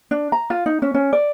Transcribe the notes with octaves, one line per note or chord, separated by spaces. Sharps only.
D4
A#5
F4
D#4
C#4
C#4
D5